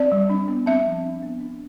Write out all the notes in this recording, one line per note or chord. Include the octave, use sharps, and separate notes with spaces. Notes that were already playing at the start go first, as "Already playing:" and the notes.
Already playing: C4 D5
G3
D4
B3
C4 E5
F3
D4
B3
D4